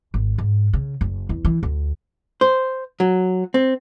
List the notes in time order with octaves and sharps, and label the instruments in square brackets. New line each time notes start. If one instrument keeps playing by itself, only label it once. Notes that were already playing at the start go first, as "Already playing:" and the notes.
[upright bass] G#1
G#2
C#3
F#1
E2
E3
D2
[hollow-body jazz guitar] C5
F#3
C4